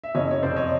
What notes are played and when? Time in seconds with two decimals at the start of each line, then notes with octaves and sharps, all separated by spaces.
0.04 E5
0.15 F#1 C#5 D#5
0.31 C#5
0.42 F2 C3 C5 D5
0.56 C#5 D#5